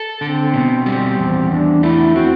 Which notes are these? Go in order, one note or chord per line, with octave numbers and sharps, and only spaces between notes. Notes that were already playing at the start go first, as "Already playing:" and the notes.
Already playing: A4
D3 C4
B2
G3
E2 C4
E2 D4
A3 E4
C4 F#4